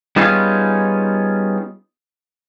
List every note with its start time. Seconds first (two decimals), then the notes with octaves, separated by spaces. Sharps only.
0.16 G3 B3 C#4 D#4 F4 G#4